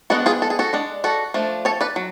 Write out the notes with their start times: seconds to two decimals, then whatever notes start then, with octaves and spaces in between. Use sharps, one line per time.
0.10 G#3 B3 D4 F#4 A4
0.26 F4 G#4
0.42 A4
0.50 G#4
0.59 F#4 A4
0.73 G#3 D4
1.04 F#4 A4
1.34 F3 A3 D4
1.65 A4 C#5
1.81 B4 D5
1.96 F#3